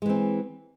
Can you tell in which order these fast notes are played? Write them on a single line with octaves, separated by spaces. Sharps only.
G#3 E3 C4